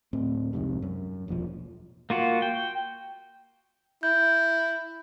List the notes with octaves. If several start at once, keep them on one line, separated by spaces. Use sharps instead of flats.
D1 A2 C4
C2 F2 G#2 C3
F#2
E1 A#1 A2 F3
A#3 F4 F#4
G5
E4 G6